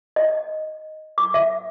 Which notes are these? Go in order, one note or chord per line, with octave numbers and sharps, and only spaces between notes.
D#5
D6
E5